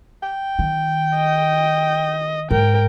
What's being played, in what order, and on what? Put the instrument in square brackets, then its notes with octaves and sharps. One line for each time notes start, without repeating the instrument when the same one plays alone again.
[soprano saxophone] G5
[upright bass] D#3
[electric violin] D#5
[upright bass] G#2 [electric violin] A#4 G5